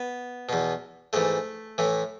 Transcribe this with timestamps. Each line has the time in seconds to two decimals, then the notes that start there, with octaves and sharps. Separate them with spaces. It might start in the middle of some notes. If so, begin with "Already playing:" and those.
Already playing: B3
0.49 E2 B2
1.13 G#2 E3 A3
1.78 A2 E3